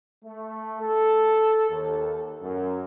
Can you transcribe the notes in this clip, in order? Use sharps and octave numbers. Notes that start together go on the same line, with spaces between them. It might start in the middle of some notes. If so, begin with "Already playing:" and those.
A3
A4
D#2
F#2